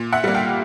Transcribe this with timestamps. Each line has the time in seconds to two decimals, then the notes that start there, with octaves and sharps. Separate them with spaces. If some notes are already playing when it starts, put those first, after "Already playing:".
Already playing: A#2
0.13 E5 F#5
0.24 G3 A#3
0.34 F5 G5